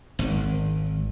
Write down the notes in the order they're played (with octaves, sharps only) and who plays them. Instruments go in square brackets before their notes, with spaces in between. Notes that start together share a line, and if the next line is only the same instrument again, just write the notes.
[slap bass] G#1